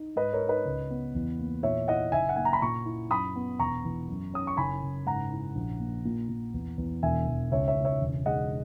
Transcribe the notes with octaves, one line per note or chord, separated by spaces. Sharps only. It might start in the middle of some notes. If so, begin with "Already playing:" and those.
Already playing: D#4
G#2 B4 D#5
A#4 C#5
D#4
B4 D#5
C#2
B3
E2
A#3
A#2 C#5 E5
E4 D#5 F#5
F#1 E5 G#5
F#5
A#3 G#5
A#5
B5
A#2 A#5 C#6
E4
F#2 B5 D#6
B3
E1 A#5 C#6
E3
F#2
C#4 D#6
C#6
F#1 G#5 B5
F#1
G#2 F#5 A#5
E4
A#1
A#3
A#2
A#2
E2
E2
E1 E5 G#5
E1
C#2 C#5 E5
C#5 E5
C#2
C#5 E5
E1
G#3 D#5 F#5